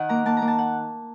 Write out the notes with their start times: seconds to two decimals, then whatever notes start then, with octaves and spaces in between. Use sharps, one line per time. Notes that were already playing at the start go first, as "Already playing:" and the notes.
Already playing: D#3 F#5
0.09 A#3 A#5
0.26 A#3 A5
0.37 A#3 A#5
0.48 A5
0.59 F#5